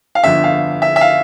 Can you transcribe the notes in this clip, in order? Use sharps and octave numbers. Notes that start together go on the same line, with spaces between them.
F5
G1 F2 D3 E5
F5
E5
E5
F5